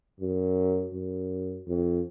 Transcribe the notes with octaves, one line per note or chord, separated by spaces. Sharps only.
F#2
F#2
F2